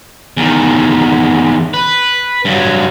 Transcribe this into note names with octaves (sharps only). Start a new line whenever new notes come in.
E2 D#3
B4
G2 F#3